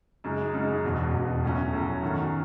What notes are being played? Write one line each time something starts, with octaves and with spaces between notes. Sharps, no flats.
F#2 C#3 G#3 D#4
F#2 C#3 G#3 D#4
E1 E2 B2
E1 E2 B2
A2 F#3 C#4
A2 F#3 C#4
F#2 D#3 F#3